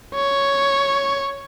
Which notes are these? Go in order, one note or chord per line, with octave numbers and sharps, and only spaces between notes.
C#5